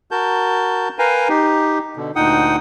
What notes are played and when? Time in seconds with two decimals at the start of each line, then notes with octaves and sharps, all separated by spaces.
0.11 F#4 A#4 A5 G6
0.99 A#4 B4 F5 G5 G#5 A#5
1.29 D#4 G4
1.96 B2 D3
2.16 D2 A#2 D#4 F#5 G5 D#6